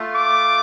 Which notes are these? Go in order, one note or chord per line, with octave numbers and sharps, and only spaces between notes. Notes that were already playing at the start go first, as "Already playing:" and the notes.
Already playing: A3 F4
D6